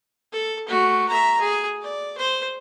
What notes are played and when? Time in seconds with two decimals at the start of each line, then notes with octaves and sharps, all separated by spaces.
0.32 A4
0.68 A3 F#4
1.08 E5 A#5
1.40 G#4
1.82 D5
2.18 C5